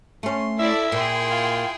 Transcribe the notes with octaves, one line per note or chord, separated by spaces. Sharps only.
A3 C#4 C6
E4 A4 D5 E5
A#2 E4 G#4 G5 C6
F4